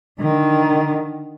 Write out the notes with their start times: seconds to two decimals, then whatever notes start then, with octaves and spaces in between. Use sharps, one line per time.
0.20 D3 D#3